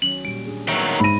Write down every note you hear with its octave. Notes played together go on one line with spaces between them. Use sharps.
D#3 F#3 C#4 F#7
A#2 G3 D7
A#2 D4 G#4
D#3 F#3 B3 C#5 E5
G#2 B5 A#6 D#7